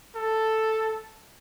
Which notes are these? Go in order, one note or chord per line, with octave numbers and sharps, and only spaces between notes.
A4